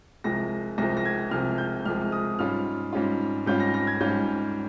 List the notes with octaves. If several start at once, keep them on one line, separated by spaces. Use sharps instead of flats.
C2 C3 F3 G#3 A#6
C2 C3 F3 G#3 A#6
A#6
G#6
C2 C3 F3 G#3 F6
G6
C2 C3 F3 G#3 F6
D#6
G#2 G3 C#4 F4 F6
G#2 G3 C#4 F4
G#2 G3 C#4 F4 G6
A#6
A#6
G#6
G#2 G3 C#4 F4 G6